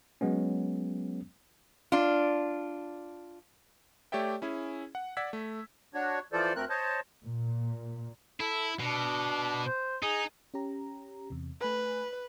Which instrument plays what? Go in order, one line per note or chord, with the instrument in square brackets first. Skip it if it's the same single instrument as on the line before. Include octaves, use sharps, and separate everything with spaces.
[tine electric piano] F#3 G#3 B3 C#4
[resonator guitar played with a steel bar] D4 F4
[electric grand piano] A3 G4 C#5 D5 E5 G5
C#4 E4 G#4
F#5
D5 F#5 E6 G#6 B6
A3
[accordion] D4 F#4 C#5
E3 F3 F4 A4 C5 D5
D2 A3 C4 A#4 F#6
C5 C#5 D#5 A5
[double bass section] A#2
[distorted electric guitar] E4 [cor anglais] A4
[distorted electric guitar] B2 [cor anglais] D4
[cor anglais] C5
[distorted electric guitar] D#4 [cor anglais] G#4
[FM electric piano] C#4 G4 A#5
E2 C3
[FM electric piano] A3 G#5 B5 [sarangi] B4